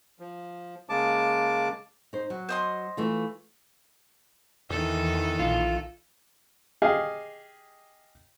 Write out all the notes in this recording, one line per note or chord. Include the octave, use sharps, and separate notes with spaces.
F3
C#3 G#3 A#3 A5 D6
D#4 C5
F#3
C5 D#5 C6
E3 A3 F4
E2 D#3 E3 A4
A#1 F4
G4 G#4 D#5 F5 D#6